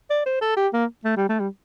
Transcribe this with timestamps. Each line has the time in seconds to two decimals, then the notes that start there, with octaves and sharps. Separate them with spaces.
0.10 D5
0.26 C5
0.41 A4
0.56 G4
0.73 A#3
1.04 A3
1.16 G3
1.29 A3
1.40 G3